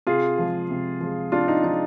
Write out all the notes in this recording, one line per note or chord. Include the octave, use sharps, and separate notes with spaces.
C3 F4 G#4
F3 G#3
C3
F3 G#3
C3 D4 F4
D#4
F3 G#3 D#4